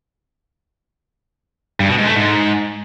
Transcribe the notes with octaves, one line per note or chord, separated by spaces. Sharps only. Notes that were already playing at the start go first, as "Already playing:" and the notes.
G2
B2
G#2
A3
G#2